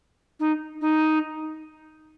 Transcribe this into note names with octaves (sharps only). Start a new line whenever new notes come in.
D#4
D#4